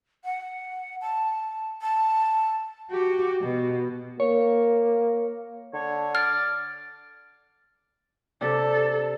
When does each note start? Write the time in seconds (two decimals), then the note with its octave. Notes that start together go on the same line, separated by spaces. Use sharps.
0.25 F#5
1.01 A5
1.81 A5
2.91 F#4 G4
3.42 B2
4.20 A#3 C#5
5.74 D3 C#5
6.15 D5 F6
8.41 C3 D4 A4